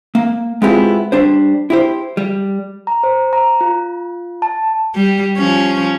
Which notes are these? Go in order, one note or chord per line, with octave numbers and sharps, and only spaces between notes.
A#3
G#3 B3 C4 E4 F4 G4
G3 D4 C5
E4 G4 C5
G3
A#5
C5
A#5
F4
A5
G3
F3 C#4